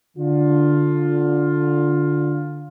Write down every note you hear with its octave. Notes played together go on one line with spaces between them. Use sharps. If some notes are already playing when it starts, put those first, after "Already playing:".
D3 F4